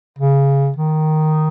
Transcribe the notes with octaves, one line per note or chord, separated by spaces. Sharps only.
C#3
D#3